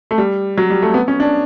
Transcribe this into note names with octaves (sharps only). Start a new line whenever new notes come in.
A3
G3
F#3
G3
A3
B3
C#4
D4